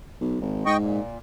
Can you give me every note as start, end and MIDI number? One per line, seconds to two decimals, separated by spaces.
0.21 0.40 35
0.41 0.65 32
0.66 1.00 44
0.66 0.77 75
0.66 0.77 79
0.66 0.77 85
0.80 1.18 46